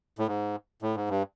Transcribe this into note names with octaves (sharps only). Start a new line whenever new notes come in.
A2
G#2
A2
G#2
G2